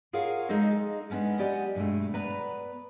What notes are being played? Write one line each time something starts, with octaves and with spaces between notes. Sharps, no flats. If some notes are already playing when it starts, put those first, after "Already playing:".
F4 G#4 A#4 C#5 F5 F#5
G#3 D#4 G#4 A4 D#5
G#3 B3 C#4 D4
G4 D5 D#5 F#5 G#5
G2 B2 F#3 G#3 A3
B3 B4 D5 A#5